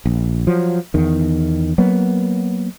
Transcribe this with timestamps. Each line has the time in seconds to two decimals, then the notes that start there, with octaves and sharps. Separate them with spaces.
0.06 A#1
0.47 F3 F#3
0.94 E2 D#3
1.78 F#3 A#3 B3